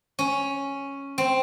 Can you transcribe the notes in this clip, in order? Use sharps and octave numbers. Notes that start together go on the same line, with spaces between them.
C#4
C4